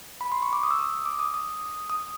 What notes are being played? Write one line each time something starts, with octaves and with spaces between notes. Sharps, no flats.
B5
C6
C#6
D6
D#6
E6
D#6
D6
D#6
D#6
D#6